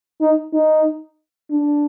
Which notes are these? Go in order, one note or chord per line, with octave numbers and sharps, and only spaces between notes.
D#4
D#4
D4